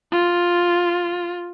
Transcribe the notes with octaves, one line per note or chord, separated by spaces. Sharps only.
F4